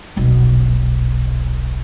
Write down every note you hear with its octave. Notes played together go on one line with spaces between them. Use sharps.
D#1 B1